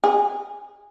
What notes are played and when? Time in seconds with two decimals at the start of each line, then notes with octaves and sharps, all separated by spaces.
0.04 G#4